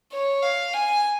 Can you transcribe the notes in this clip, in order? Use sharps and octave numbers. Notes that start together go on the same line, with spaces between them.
C#5
F5
G#5